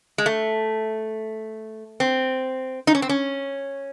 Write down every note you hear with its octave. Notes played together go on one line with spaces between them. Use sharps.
G#3
A3
C4
D#4
C#4
C4
C#4